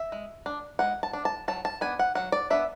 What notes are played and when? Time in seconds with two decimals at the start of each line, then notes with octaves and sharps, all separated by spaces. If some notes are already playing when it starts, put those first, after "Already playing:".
Already playing: E5
0.12 G#3
0.46 D4
0.79 G#3 F#5
1.03 A5
1.13 D4
1.25 A5
1.48 F#3 A5
1.65 A5
1.81 B3 D4 G#5
1.99 F#5
2.15 F#3 F#5
2.32 D5
2.50 B3 D4 E5